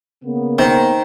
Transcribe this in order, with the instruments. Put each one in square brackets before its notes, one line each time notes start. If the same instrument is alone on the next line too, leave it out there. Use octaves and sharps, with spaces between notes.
[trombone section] C#3 A#3 B3
[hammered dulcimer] D#3 [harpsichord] C4